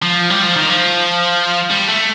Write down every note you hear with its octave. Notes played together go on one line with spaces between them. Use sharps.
F3
G3
F3
D#3
F3
G3
A3